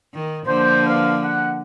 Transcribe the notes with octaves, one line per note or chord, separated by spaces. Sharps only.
D#3
D3 F3 A#3 C5
B4 C5 F5
F#5